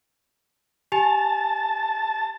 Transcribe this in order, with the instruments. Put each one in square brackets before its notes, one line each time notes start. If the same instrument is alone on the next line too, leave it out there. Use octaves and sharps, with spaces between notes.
[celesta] G4 G#5 F7 [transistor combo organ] A5